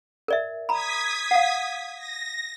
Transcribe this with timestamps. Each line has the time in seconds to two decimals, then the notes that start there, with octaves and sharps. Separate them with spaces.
0.28 A#4 D5 E5
0.69 A#5 B5 D#6 G#6 B6
1.31 F5 F#5
1.97 A#6